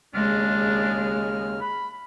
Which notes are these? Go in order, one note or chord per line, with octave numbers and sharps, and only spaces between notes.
D#2 C#3 G#3 D4 F6
B5